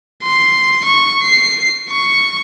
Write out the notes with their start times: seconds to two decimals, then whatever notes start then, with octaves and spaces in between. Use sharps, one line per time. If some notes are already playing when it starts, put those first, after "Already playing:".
0.23 C6
0.84 C#6
1.23 C7
1.89 C#6